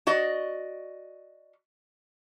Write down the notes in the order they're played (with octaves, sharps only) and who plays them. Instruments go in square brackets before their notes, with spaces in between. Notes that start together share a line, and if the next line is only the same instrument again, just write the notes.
[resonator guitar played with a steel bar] F#4 D5 D#5